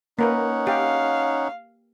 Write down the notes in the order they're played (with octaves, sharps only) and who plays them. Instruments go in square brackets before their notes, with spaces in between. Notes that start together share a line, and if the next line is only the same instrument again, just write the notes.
[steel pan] A#3 A#4 B4 [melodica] C#4 D#4 F#5
[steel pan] G4 [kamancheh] F5